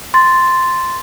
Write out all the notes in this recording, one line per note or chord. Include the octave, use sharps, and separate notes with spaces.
C6 A6